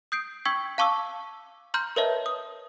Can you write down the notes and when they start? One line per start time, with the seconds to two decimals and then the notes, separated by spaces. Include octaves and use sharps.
0.12 D#6 G6 C7 D7
0.45 G5 C#6 E6 G#6 B6 F#7
0.78 F5 A5 C#6 D6 E6
1.74 A#5 C6 F6 G6
1.96 A#4 B4 C#5 D#5 E5 A5
2.26 D#6